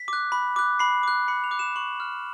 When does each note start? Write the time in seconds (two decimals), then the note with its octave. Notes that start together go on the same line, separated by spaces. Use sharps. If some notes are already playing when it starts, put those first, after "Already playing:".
Already playing: B6
0.08 D6 F#6
0.32 B5
0.56 D6 F#6
0.79 B5 C7
1.03 D6 F#6
1.28 B5 C#7
1.44 F7
1.51 D6 F#6
1.59 E7
1.76 C#6 F#7
2.00 F6